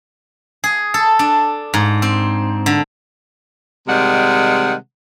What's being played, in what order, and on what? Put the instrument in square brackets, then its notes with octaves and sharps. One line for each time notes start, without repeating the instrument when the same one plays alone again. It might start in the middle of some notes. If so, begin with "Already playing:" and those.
[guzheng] G#4
A4
D4
G#2
C4
D3
[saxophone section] C3 D#3 G3 G#3 F#5